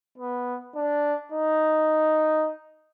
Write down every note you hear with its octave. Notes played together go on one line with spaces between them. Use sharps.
B3
D4
D#4